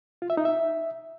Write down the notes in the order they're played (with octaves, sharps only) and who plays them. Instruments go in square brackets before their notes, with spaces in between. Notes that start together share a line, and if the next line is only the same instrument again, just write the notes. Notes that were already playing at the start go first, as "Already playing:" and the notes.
[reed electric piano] F4
E5
D#4
E5